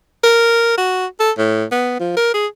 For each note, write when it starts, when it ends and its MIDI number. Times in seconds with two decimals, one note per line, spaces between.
0.24 0.77 70
0.78 1.06 66
1.20 1.31 69
1.38 1.65 45
1.72 1.95 59
2.00 2.14 53
2.17 2.30 70
2.34 2.46 68